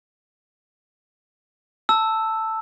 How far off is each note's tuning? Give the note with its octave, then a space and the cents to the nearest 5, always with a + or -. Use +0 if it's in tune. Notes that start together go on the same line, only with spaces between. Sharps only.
A5 +10 E6 +0